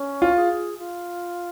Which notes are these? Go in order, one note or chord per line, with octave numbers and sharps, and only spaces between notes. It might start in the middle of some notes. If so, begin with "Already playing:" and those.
Already playing: C#4
F4
G#4
F4